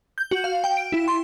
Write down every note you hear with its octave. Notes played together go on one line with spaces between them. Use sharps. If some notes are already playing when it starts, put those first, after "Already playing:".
G6
F#4
F5
G5
D7
E4
C6